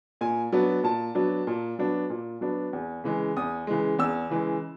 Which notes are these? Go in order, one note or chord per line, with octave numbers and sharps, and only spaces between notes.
A#2 G#5
F#3 B3 D4
A#2 A5
F#3 B3 D4
A#2
F#3 B3 D4
A#2
F#3 B3 D4
E2
C#3 E3 G#3
E2 D#6
C#3 E3 G#3
E2 E6
C#3 E3 G#3